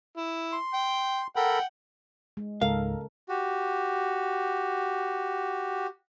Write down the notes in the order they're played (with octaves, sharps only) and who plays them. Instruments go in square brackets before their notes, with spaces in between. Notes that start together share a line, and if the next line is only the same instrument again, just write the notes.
[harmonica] E4
[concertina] C6
[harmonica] G5
[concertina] A4 A#4 B5 [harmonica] F#5 G5
[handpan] G#3
[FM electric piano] C#2 G#2 [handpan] C#3 A4 A#4 [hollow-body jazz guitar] F5
[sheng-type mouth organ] F#4 G4